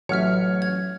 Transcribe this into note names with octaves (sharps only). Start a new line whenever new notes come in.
A1 F#3 C#5 E5 F#5 F6
G#6